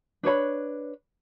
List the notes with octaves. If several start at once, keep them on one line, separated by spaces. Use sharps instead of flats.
D4 B4 C#5 B5